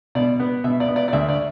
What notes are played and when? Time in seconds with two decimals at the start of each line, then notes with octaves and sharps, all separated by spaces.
0.15 B2 D5
0.40 B3
0.64 B2 E5
0.80 D5
0.88 B3
0.96 D5
1.08 D5
1.12 D2 E5
1.29 D5